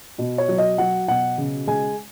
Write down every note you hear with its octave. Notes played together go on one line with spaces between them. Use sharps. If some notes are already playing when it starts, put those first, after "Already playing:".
B2
C#5
F#3
D#5
F#3 F#5
B2 F#5
C#3
G#3 G#5